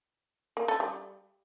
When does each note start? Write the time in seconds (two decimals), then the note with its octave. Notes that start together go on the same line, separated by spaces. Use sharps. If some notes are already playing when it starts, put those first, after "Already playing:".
0.57 A#3
0.68 A4
0.80 G3